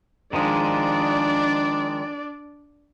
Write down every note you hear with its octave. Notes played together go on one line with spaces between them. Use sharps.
D#3 F3 G#3 D4 D5